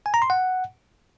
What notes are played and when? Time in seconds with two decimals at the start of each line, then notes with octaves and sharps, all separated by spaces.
0.06 G#5
0.14 A#5
0.22 C6
0.30 F#5